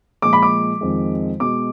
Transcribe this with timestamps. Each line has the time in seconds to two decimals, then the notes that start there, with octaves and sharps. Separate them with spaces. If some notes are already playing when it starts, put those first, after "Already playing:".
0.22 A#2 F3 G#3 D6
0.33 B5
0.42 D6
0.81 F2 D#3 G#3
1.40 B2 G#3 D6